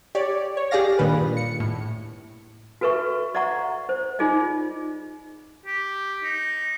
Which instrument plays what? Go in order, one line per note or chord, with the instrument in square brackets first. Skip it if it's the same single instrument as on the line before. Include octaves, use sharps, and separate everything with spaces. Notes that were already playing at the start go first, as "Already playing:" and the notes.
[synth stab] G4 C#5 D5
C#5
G4 G#4 D5 F5 A#6
G2 A#2 D#3 B4
C#7
A2
[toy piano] F#4 A4 B4 E5 C#6
D5 E5 F#5 A#5 C#6
C5
D#4 F4 G#4 D5 D#5
[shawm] G4
D#4